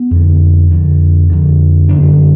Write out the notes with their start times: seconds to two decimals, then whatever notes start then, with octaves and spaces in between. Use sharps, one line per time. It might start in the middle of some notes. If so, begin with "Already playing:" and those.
Already playing: B3
0.11 F2 D3
0.71 F2 D3
1.30 F2 D3
1.89 F#2 D3 D4